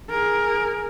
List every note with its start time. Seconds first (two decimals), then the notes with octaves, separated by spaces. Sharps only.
0.11 G#4 A#4